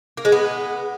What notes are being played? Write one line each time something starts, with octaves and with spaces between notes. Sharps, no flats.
A#3
G#3
B3